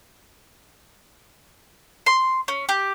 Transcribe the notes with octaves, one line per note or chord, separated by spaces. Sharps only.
C6
C#4
G4